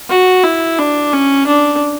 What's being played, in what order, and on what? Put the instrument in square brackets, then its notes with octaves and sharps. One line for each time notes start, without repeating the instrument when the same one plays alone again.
[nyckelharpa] F#4
E4
D4
C#4
D4